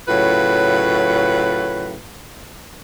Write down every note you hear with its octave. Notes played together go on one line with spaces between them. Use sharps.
A2 C#3 F#3 F4 B4